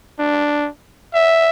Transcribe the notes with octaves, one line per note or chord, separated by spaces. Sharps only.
D4
E5